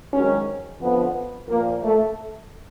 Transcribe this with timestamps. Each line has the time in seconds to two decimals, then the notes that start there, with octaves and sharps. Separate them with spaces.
0.13 G#2 D#3 F#3 C#4
0.81 F2 D3 F3 B3
1.49 A#2 F3 A#3
1.84 A3